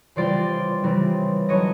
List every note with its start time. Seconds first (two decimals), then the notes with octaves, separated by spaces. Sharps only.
0.16 C#3 E3 G3 C4 F4 C5 D5
0.83 C#3 E3 G3 C4 F4
1.49 D3 F#3 B3 D#4 C#5 D#5